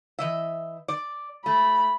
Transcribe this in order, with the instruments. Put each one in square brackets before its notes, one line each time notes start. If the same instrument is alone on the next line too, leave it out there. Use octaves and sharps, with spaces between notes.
[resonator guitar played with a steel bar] E3 D#5 E5
D5
[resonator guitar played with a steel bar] A3 [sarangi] B5